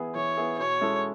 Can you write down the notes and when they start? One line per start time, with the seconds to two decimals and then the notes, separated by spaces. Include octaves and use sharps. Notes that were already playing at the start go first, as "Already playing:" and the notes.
Already playing: E3 B3 E4 G#4
0.15 E3 C#5
0.37 B3 E4 G#4
0.59 B2 C#5
0.81 G#3 C#4 E4 A4